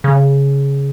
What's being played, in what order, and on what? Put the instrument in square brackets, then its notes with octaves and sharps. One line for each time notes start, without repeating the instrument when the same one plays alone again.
[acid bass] C#3